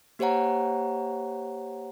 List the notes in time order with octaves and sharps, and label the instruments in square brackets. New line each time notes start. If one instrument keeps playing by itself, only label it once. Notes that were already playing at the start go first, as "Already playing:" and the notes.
[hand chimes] A#3 G4 C5 C#5 F#5 A#5